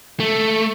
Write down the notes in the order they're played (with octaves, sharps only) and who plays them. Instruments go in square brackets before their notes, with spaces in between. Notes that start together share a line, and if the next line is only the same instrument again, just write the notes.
[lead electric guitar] A3